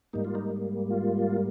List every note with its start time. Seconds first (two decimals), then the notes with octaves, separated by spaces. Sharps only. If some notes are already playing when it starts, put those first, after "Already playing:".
0.13 G#2 G3 A#3 D#4
0.25 F4
0.35 D#4
0.90 F4